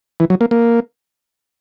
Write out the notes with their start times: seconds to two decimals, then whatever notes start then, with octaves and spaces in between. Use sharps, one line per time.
0.20 E3
0.30 F#3
0.41 A#3
0.51 A#3